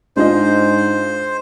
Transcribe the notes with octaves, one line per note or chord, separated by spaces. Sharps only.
G#2 D4 F4 C5 D#5